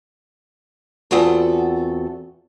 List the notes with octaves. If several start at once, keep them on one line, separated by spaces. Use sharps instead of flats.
E2 C4 F4 F#4 A4